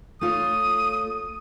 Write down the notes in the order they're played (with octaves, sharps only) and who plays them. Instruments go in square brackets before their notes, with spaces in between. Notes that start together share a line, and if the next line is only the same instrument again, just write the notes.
[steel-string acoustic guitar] A3 F4 C#5 [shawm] D#6